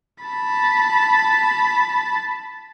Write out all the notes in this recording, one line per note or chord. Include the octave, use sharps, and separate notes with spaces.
A5 B5